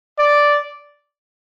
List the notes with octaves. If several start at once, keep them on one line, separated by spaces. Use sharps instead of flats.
D5